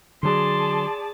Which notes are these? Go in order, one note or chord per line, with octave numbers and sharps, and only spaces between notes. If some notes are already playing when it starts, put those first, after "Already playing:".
D3 F#3 G#4 D5 A5 C6